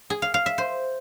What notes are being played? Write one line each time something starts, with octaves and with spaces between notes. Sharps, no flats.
G#4
F5
F5
E5
C5